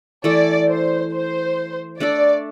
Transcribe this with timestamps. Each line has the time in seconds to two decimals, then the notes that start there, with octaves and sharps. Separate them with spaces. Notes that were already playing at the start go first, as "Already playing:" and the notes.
0.24 E3 A3 E4 A4 D5
0.69 C5
1.13 C5
2.00 A3 D4 A4 D5